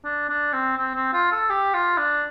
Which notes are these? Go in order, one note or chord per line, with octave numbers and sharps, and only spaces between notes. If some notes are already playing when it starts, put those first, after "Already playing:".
D4
D4
C4
C4
C4
F4
A4
G4
F4
D4